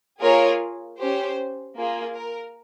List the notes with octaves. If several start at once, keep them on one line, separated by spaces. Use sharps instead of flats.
A#3 F4 G#4 A#4 C#5
C#4 G4 C5
A#3 F4 G#4
A#4